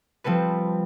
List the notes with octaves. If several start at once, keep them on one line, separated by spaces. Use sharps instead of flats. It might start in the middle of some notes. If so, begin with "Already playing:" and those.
F3 G3 C4 A4 B4